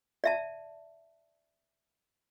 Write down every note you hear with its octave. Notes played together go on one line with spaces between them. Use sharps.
D5 E5 A5